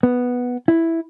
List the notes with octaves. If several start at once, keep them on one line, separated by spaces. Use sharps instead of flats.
B3
E4